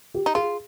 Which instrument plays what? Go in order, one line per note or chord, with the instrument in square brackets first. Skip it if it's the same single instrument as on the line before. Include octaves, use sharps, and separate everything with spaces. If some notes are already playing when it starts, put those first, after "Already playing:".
[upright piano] G4
[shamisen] D#4
[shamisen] F4 [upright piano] G#4